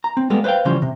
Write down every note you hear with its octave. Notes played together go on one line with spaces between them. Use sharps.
A#5
C4
G3 G#3 A#3 B3 A4 A#4
B4 C5 D5 F5 G5
C#3 E3 F3 G3 C#4 C5
C3